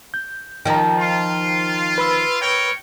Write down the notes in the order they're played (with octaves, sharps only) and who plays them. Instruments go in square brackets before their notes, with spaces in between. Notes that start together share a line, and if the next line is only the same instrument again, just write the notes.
[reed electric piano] G6
[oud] D#3 F3 [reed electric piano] G5 A#5
[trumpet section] F4
[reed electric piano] B4 B5 E6
[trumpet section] A#4 C#5 G5